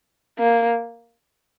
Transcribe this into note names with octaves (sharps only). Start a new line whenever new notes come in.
A#3